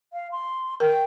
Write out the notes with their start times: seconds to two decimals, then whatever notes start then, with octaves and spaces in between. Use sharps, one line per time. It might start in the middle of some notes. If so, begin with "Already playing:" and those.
0.13 F5
0.31 C6
0.80 A#4 G5